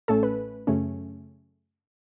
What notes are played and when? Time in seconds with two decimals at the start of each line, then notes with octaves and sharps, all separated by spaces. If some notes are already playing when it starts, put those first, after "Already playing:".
0.08 A1 A2 A3 C#4 A4
0.23 B4
0.67 F#2 C#3 A3 C#4